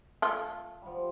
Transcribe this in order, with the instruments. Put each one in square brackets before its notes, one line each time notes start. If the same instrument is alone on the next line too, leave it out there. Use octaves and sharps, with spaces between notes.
[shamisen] A3 F4
[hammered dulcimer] F3 G3